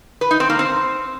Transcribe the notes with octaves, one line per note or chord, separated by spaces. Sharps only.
B4
D#4
C4
A#3
C4